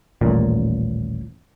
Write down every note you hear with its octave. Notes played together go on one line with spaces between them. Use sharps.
D#1 A1 A#2